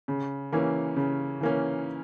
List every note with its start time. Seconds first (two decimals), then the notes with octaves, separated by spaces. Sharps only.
0.08 C#3
0.52 E3 A#3 C#4
0.96 C#3
1.41 E3 A#3 C#4